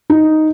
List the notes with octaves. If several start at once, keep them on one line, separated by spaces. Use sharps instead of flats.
D#4